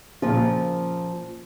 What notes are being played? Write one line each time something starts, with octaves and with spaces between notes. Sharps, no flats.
A#2 C#3 F3